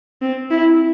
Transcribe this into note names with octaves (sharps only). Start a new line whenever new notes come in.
C4
E4